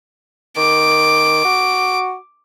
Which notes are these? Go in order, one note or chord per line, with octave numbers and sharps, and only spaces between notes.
D#3 D6
F#4